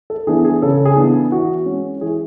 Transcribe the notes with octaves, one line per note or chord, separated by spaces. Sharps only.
A4
E3 B3 D4 G#4
G#4
C#3 A4
G#4
E3 B3 D4
E3 F#4
G#3 C#4
E3 G#4